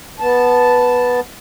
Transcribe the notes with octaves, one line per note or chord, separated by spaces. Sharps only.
B3 A5